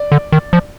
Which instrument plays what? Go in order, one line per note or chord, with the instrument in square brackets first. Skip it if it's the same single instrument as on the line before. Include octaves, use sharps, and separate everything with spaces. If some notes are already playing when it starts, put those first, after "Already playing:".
Already playing: [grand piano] D5
[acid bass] D3
D#3
F3